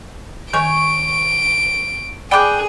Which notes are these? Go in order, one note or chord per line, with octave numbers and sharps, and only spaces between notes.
D#3 C#5 G#5 D7
G#4 D5 G5 B5 D6 F#6